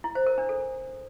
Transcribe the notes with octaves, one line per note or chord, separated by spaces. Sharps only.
E4
C5
A#4
D4
A4